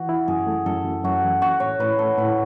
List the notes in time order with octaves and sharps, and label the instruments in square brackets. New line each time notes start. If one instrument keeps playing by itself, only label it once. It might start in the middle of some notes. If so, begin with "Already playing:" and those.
Already playing: [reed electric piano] E3 [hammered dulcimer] F#4
[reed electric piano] E4
[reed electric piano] F#2 [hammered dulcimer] G#4
[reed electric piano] A3
[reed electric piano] F#2 [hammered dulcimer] A4
[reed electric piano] F#2
[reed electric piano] F#2 [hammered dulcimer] F#4
[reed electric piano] E3
[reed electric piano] C#4 [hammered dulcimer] F#4
[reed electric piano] A2 [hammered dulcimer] C#5
[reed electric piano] A2 [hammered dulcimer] B4
[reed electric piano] A3 [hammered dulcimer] A4
[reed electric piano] A2 [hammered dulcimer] B4